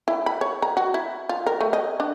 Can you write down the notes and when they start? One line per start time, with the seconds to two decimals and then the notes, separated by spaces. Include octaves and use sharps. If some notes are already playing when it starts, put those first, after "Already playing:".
0.08 E4
0.26 B5
0.41 C#5
0.62 A#5
0.77 F#4
0.94 E4
1.29 F4
1.46 A#4
1.61 A3
1.73 D#5
2.00 D4